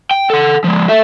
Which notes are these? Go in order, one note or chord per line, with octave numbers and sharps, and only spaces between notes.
G5
A4 F#5
F3 G#3
A4 E5